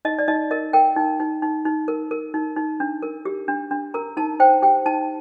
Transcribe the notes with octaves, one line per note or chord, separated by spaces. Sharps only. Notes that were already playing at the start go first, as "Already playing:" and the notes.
D#4 D#5
D5
D#4 D#5
A#4 D#5
A#4 G5
D#4
D#4
D#4
D#4
A#4
A#4
D#4
D#4
D4
A#4
G4
D4
D4
A#4 A#5
D#4 A5
C5 G5
G4 G5
D#4 A5